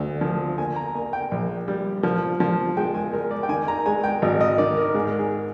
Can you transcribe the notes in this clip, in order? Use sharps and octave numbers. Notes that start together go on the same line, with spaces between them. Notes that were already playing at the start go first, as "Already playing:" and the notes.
Already playing: D2
F3
A#3 G#5
A#5
A#3 G#5
G5
A#1
G3
F3
F3
G#3 G5
G#5
G#3 A#4
D5
G5
D#3 G#5
A#5
G#3 G#5
G5
G#1 D#5
D#5
D#3 D5
A#4
G#2 G#4
G#4